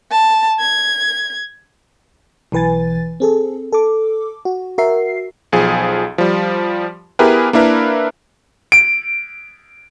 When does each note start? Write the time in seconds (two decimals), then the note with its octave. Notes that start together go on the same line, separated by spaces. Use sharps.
0.11 A5
0.60 G#6
2.52 B1 E3 B4 G#5 A6
3.20 C4 G#4 A4
3.73 A4 D6
4.45 F#4
4.78 F#4 A#4 E5 C7
5.52 B1 F3 G#4
6.18 F3 G3
7.19 B3 E4 G4 G#4 A#4 B4
7.53 A#3 D4 E4 A#4 B4
8.72 D7